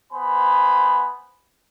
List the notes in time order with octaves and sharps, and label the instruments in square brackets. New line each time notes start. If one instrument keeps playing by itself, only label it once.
[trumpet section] B3 C5 G#5 B5